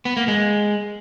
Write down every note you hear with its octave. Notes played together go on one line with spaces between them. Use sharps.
B3
A#3
G#3